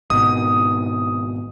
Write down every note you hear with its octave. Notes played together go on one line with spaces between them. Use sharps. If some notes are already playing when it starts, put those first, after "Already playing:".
G#1 B2 D#6